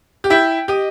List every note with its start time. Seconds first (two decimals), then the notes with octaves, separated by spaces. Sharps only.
0.24 G4
0.30 E4 G5
0.68 G4 D#5